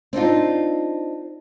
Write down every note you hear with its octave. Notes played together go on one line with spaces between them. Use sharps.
C4 D4 D#4 F4